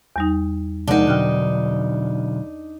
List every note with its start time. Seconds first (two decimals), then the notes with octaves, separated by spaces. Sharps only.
0.16 E2 G3 D#4
0.88 C3 F3 G#3 D4 D#4 A#4 F#5 A5
1.08 B2 D3 F#3 G5 F6 F#6